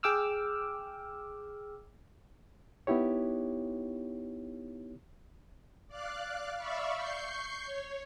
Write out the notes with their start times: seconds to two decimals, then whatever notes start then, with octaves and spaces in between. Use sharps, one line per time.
0.03 G#4 G5 D6 E6 F6
2.87 B3 D#4 E4 G4 C#5
5.88 D5 F5 F#6
6.56 D5 E5 F5 B5 C#6
6.96 C#6 G6 C7
7.63 C#5